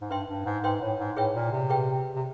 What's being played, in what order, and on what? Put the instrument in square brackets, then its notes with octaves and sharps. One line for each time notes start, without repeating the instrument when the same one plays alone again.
[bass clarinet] G#2
[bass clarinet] G2 [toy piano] B4 E5 G5 C6
[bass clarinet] G2
G#2
[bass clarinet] G#2 [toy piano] B4 E5 G5 C6
[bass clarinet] A2
G#2
[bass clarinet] A2 [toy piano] G#4 B4 E5 G5
[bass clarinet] A#2
C3
[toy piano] G#4 B4 E5 G5
[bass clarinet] C3